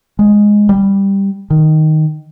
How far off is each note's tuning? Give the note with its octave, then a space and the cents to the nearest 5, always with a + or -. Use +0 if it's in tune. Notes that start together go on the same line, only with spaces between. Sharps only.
G#3 +0
G3 +5
D#3 +0